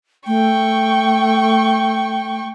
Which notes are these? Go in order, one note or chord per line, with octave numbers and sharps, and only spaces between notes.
A3 G5 C#6